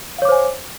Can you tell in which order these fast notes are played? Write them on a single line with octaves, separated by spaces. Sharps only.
F5 C#5 D6 C5 G#5